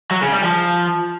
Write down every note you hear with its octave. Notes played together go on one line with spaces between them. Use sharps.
F#3
C#3
G3
F3